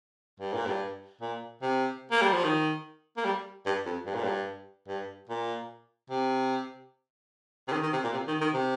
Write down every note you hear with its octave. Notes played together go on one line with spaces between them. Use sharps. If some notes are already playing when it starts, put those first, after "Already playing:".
G2
A#2
G2
A#2
C3
A#3
G3
F3
D#3
A#3
G3
G2
F2
G2
A#2
G2
G2
A#2
C3
C3
D#3
D#3
C3
A#2
C3
D#3
D#3
C3